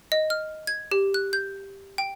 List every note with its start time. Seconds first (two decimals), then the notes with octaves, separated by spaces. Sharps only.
0.12 D#5
0.30 F6
0.67 G#6
0.92 G4
1.14 F#6
1.33 G6
1.98 G5